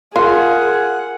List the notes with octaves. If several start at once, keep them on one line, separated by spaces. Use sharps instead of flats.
F4 G#4 A#4 F#5